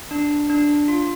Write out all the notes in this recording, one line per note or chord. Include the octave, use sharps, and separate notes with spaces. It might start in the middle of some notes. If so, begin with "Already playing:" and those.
D4
D4
F4